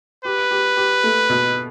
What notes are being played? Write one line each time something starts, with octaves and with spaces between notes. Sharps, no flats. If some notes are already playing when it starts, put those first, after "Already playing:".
G4 B4
G4
G4
A3
B2